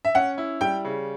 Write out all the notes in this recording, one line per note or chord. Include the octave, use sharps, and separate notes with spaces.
E5
C#4 F#5
E4
G3 G5
C#3